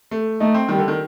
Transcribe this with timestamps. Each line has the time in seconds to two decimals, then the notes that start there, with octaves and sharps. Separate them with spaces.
0.11 A3
0.40 A3 D#4
0.54 C4
0.69 D#3 G3
0.78 D3
0.88 D#3